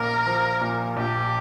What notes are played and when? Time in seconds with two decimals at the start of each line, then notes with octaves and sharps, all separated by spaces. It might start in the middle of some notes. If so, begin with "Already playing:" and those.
Already playing: A#1 A#3 A#4
0.26 F3
0.61 A#2
0.96 A#1 G4